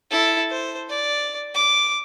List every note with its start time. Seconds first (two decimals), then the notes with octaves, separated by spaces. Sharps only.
0.11 E4 A4
0.50 C5
0.89 D5
1.54 D6